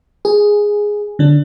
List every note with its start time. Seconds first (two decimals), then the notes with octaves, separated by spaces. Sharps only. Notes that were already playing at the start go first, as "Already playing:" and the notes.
0.25 G#4
1.19 D3 D4